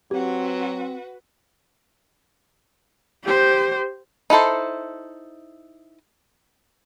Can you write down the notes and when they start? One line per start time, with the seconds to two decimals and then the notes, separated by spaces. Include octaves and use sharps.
0.11 F#3 C4 F#4 G4 B4
3.25 G4 C5
4.30 D#4 E4 A4 C5